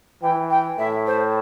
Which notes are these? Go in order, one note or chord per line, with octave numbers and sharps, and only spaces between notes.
E3 G5
G5
A2 E5
C5